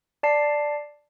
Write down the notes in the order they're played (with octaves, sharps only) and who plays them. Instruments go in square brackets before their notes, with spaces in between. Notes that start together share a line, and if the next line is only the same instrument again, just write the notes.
[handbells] D5 A5 C7